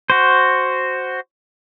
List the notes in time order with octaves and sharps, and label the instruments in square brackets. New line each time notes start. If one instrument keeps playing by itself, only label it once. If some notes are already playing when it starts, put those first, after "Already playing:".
[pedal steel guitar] F#4 C5